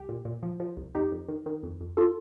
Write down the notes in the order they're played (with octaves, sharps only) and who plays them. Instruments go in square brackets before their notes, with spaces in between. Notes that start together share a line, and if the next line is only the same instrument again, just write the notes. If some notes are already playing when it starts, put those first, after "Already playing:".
Already playing: [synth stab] C2 G4
A#2
A#2
F3
F3
C2
F2 D#4 G4
F2
D#3
D#3
F2
F2
F4 A4